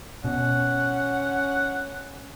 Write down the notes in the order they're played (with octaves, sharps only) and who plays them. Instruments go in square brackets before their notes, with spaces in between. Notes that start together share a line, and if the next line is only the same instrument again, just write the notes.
[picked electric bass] B2 [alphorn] C#4 [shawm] F#5